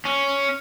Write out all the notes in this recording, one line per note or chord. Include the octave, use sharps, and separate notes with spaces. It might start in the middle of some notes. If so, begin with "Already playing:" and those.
C#4